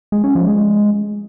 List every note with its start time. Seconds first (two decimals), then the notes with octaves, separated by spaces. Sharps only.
0.12 G#3
0.24 C#4
0.35 F3
0.47 G#3